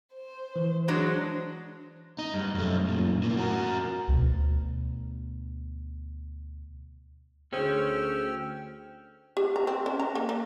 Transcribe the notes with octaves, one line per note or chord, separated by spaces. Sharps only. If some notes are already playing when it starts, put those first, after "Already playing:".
C5
E3
F#3 G#3 D4 C5
D#4
G2
F#2 A3
F#2 A#2
A2 A#3
F#4 A#4
D2 B2
D2 C#4 G#4 C5 C#5 G5 E6 F6
G4
A#5
C4
C#4
A#5
A#3
A#3